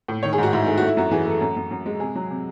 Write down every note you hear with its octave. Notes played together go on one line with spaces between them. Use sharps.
A2
D#3 C#5
G#4
G#2 F#4
G#2 E4
A3 G#4
A3 F#4
E4
F#2 F#4
E3 G#4
A3 A4
F#2
F#2
F#2
G#3
C3 G#4
F#3
C3